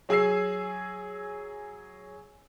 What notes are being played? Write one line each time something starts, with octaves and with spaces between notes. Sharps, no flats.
F#3 G#4 G#5 E6 C7